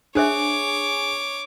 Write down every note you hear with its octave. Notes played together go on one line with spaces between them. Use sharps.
D4 G#4 C5 C#5 E5 D6